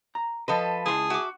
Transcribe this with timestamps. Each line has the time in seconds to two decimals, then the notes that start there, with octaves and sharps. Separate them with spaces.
0.15 A#5
0.48 F3 A4 B4 D#5
0.86 C#2 E4 G#4 A5 C6 D#6
1.10 F#4 E5 D6